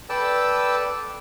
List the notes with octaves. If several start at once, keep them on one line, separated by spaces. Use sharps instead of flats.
A4 B4 D5 G5 A5 E6